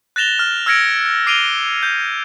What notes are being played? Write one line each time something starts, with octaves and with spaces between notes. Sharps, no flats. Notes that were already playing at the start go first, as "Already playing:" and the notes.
F#6 A6 A#6 E7 F7 G7
F6
E6 F6 G#6 A#6 C#7 D7
D6 C7 D7 D#7 F7 G7
G6